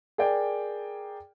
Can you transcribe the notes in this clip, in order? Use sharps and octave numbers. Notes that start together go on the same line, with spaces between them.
G#4 A#4 D5 G5